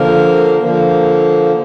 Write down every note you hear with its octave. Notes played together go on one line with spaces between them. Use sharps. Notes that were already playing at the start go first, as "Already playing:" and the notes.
Already playing: D3 F3 A#3 A#4
D3 F3 A#3